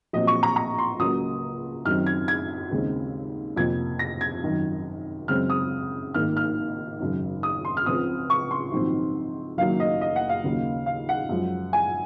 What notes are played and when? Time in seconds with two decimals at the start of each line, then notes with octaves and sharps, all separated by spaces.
0.13 A#1 A#2 F#3 C4 D#5
0.27 C#6
0.43 A#5
0.56 A#5
0.78 C6
0.99 C#2 C#3 F#3 A#3 D#6
1.85 F#2 D#3 F#3 C4 F6
2.06 G#6
2.28 G#6
2.71 D#2 C#3 G#3 C4
3.56 F2 C3 F3 A#3 G#6
3.99 A#6
4.21 G#6
4.43 G#1 F#2 D#3
5.28 F#2 C#3 G#3 C4 F6
5.50 D#6
6.14 G#1 G#2 D#3 A#3 F6
6.37 F6
7.00 G#1 F#2 C#3
7.43 D#6
7.65 C6
7.77 F6
7.86 C#2 C#3 F3 C4 D#6
8.30 C#6
8.51 C6
8.72 A#1 G#2 D#3 F#3 C4
9.57 F#1 F#2 D#3 F#3 A#3 F5
9.80 D#5
10.01 D#5
10.16 F#5
10.29 F5
10.44 D#2 C#3 F#3 A#3
10.86 F5
11.09 F#5
11.29 F#2 F3 G#3
11.73 G#5